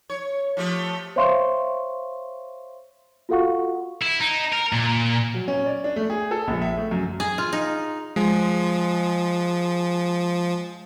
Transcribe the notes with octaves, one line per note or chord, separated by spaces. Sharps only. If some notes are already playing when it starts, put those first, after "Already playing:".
C#5
F3 A3 G4
C5 C#5 E5 F5 C6 C#6
F4 F#4 A4 F5 F#5 C#6
E4
D#4
A#4
A#2
F#3
C#4
D5
D4
A3
G#4
A4
A#1
E5
A3
F#2
G#4
F4
D#4
F3 G#3